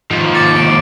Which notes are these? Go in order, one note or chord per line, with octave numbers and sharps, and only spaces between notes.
D#2 G#2 F3
D6 A6 C#7
D7